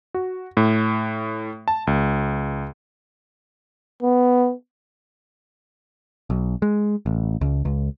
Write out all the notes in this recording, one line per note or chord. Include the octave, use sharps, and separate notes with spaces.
F#4
A2
A5
C#2
B3
B1
G#3
A1
C#2
C#2